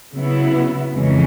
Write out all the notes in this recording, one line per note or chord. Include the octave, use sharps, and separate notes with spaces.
C#3 F#3 B3 E4
F2 C#3 E3 G#3 C#4